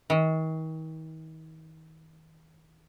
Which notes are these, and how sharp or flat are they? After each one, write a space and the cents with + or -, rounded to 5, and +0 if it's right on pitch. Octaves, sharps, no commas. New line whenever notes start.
D#3 +40